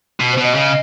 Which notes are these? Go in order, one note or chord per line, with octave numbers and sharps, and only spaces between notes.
B2
C5
B2
D#5
C#3